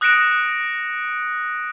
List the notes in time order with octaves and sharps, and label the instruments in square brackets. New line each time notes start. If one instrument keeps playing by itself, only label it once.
[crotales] D#6 F#6 A#6 C#7 D7 E7